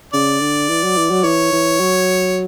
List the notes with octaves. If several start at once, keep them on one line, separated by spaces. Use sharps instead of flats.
C#3 D5
D3
E3
F#3
E3
F#3
E3 C#5
E3
F#3